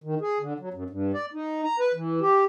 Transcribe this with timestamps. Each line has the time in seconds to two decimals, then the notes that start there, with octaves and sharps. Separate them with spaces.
0.04 D#3
0.21 G#4
0.40 D3
0.60 F#3
0.74 F#2
0.90 G2
1.14 D5
1.33 D#4
1.64 A#5
1.79 B4
1.94 E3
2.21 G4